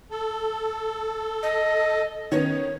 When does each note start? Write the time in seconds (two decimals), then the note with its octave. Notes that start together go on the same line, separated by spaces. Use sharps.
0.11 A4
1.43 D#5
2.32 D#3 B3 C#4 C#5